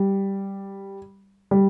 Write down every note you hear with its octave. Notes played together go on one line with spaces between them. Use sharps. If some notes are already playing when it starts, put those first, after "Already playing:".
Already playing: G3
G3